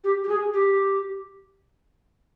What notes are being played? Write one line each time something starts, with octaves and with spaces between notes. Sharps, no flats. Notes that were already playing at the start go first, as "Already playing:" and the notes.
G4
G4
G#4
G4